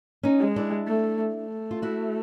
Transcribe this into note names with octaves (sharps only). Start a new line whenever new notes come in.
C#4 D#4
G#3
D4 E4
A3
A3
F4
E4 F#4